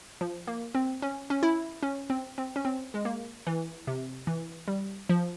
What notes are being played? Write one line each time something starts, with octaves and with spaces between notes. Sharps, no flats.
F3
A#3
C4
C#4
C#4
E4
C#4
C4
C4
C#4
C4
G#3
A#3
E3
C3
E3
G3
F3